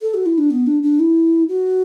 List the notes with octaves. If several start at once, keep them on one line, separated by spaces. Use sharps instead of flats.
A4
F#4
E4
D4
B3
D4
D4
E4
F#4